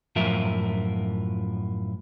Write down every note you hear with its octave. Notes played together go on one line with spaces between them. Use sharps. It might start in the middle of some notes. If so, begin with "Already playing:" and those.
F#2 A2 F3 F4 A#4 E5